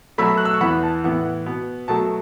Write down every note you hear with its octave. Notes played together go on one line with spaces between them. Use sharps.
B2 F#3 A3 B5 E6
F#6
E6
C#6
E2 E3 B3 F#5 B5
A5
A2 E3 B3 F#5
B2 B3
B2 F#3 A3 A5